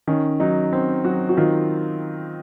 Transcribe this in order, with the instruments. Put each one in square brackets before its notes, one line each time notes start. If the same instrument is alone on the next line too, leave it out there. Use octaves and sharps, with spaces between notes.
[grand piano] D#3 [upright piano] C#4
[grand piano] F#3 [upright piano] D#4
[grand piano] C4
[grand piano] F#3 [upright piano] F#4
[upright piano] F#4
[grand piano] D#3 [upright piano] F4